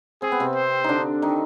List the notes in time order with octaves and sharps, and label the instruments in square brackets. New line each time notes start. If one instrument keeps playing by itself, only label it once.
[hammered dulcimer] C4 [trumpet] G#4
[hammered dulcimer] B3
C3 C4
[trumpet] C5
[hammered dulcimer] D3 D4 D#4
D#3 D#4